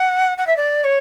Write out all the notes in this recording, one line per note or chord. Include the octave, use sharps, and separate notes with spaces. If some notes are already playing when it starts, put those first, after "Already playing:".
Already playing: F#5
F#5
E5
D5
C#5